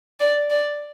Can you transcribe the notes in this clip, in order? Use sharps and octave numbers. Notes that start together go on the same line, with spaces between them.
D5
D5